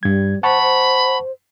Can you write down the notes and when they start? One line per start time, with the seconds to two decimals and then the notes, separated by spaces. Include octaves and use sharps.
0.03 G2 G3 G#6
0.43 C5 F#5 A5 B5 C#6
0.62 C5